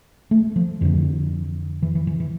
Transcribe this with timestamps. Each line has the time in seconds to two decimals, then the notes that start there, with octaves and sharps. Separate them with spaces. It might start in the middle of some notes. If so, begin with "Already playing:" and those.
0.31 A3
0.56 F3
0.81 F2 D3 E3
1.82 E3
1.95 E3
2.07 E3
2.20 E3